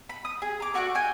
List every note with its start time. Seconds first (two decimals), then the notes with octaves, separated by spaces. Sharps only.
0.09 B5
0.25 D#6
0.42 G#4
0.60 A#5 D6
0.74 A3 F#4 D5 F#6
0.95 G5 G#5